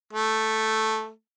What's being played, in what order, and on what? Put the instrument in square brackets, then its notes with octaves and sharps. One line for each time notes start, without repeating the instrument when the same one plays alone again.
[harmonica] A3